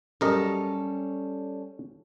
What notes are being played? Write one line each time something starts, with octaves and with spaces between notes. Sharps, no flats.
F#2 G3 C#4 A4 A#4 D#5